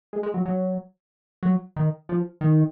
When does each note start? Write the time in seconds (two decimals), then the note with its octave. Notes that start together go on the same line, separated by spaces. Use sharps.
0.13 G#3
0.23 G#3
0.34 F#3
0.45 F#3
1.43 F#3
1.76 D#3
2.09 F3
2.41 D#3